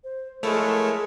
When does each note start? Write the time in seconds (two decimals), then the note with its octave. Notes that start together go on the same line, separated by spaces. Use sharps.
0.04 C5
0.43 F3 G#3 A3 E4 A4 A#4 C#5